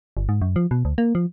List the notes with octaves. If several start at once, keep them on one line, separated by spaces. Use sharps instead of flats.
G1
G#2
F#2
F3
B2
D2
A#3
F3